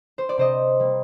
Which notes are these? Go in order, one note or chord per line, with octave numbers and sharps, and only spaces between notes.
C5
D5
C3 C5 D#5
G3 A#3